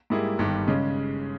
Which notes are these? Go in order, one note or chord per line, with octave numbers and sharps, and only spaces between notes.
G#2 G3 A#3 E4 G#4
G1 G2 D#3 G3
C#3 G#3 C#4